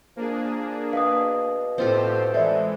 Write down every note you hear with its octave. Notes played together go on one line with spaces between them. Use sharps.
F3 A#3 D4 G#4
B2 F5 D#6
A2 C4 F4 G4 A4 C5
E3 G#3 A4 D5 E5